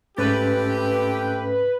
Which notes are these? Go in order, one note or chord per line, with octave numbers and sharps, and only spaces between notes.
G#2 A3 C4 C#4 G4 B4 A6